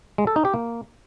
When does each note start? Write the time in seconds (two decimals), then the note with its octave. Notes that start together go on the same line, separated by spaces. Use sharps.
0.18 G#3
0.27 A4
0.36 D#4
0.45 G4
0.54 A#3